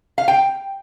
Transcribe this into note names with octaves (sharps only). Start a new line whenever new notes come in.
F5
G5